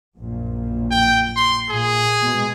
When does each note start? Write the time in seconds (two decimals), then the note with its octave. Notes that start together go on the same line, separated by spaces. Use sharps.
0.17 A#1 F#2 A#2
0.91 G5
1.36 C6
1.70 A#2 G#4
2.21 B2 G#3